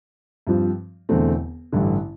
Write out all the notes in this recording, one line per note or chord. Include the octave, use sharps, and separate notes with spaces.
G2 F3 C4 F4
E1 E2 D3 A3 C4
A1 G2 D3